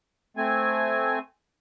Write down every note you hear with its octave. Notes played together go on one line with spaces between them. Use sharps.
A3 C4 G#5